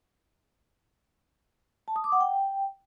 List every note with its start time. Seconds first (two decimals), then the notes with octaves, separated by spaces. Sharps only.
1.88 A5
1.96 D#6
2.04 D6
2.12 F#5
2.21 G5